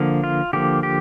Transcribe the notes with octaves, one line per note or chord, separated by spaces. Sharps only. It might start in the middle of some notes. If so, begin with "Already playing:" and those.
Already playing: D3 F3 A#3
F4
D3 F3 A#3 G4
G4